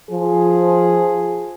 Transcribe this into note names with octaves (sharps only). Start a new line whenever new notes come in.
F3 G#4